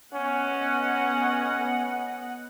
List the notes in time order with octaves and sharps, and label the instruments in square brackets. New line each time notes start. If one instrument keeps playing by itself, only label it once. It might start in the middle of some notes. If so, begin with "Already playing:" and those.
[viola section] B3 D#5 F#5 [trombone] C#4